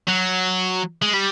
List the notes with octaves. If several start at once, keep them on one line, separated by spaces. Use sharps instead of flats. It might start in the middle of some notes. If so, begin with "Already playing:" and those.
F#3
G#3
G3